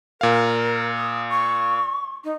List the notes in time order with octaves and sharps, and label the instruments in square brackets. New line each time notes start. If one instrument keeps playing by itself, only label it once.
[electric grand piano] A#2 F5 [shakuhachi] A#4
[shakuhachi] D#6
C#6
D#4